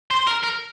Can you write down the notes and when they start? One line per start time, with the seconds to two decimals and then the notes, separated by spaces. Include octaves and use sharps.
0.11 C5
0.27 A#4
0.43 A#4